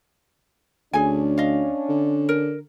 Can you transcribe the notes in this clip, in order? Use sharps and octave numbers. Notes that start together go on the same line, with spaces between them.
D2 C#4 D4 G#4 G#5
D#5 F5
D3
A#4